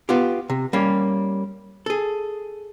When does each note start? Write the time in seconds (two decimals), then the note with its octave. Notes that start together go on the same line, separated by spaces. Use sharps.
0.09 B3 F4 G4
0.50 C3
0.73 G3 A#3 C#4
1.86 G#4 A4